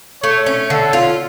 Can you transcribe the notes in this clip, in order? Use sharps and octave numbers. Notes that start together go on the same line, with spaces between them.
A3 C#5
C#4
D3 A4
F4